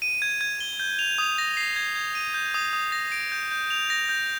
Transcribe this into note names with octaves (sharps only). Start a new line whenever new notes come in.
D#7
G#6
G#6
G7
G6
F7
D#6
A#6
C7
G#6
G#6
D#7
G6
D#6
D#6
A#6
D7
G6
G6
F7
A#6
G6